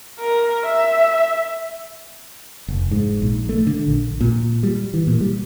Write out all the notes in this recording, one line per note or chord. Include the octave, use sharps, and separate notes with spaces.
A#4
E5
F1
G#2
A#1
A3
D3
A#1
A#2
G3
E3
A#2
G3